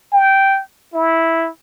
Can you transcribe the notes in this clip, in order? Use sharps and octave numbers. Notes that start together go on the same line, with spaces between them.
G5
E4